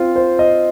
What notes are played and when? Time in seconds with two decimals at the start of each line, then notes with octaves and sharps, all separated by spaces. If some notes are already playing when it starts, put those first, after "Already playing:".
Already playing: C4 F4
0.16 C5
0.39 D#5